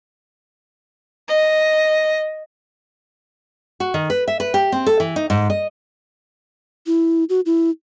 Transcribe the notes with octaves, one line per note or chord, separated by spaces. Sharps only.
D#5
F#4
D#3
B4
E5
B4
G4
C4
A4
E3
D#4
G#2
D#5
E4
F#4
E4